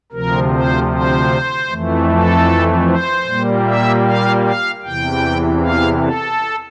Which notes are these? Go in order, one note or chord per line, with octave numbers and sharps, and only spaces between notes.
D2 C3 F3 A#4
C5
C5
F2 E3 A3
A4
C5
A#2 G3 A#3
E5
F5
F5
E2 C3 E3 G5
F5
A4